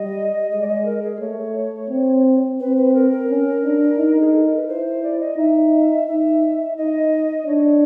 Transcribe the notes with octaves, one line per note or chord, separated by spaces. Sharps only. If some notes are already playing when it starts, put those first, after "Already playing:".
Already playing: G3 D#5
G#3 D#5
D5
D#5
A#4
G#4
A3 C#5
C4
C4 B4
B4
A#4
A#4
C#4
D4
D#4
G#4
A4
A#4
B4
E4 C5
C5
D5
D#5
D#4 E5
D#4 E5
D#4 D#5
D4 C#5